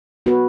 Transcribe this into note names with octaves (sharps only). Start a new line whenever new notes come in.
B3 F#4 B4